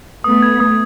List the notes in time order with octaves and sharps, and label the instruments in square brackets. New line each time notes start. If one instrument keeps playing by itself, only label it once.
[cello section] A3 B3 [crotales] D#6
[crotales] G#6
D#6